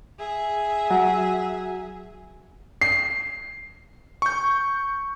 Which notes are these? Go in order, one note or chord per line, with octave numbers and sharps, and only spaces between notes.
G#4 E5
F#3
C7
C#6 G6